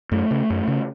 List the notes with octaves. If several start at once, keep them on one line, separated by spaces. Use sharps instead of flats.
F#2 A3
C#3
F#2
C#3